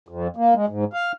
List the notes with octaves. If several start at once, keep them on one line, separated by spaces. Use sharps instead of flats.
F2
A#3
G#3
G#2
F5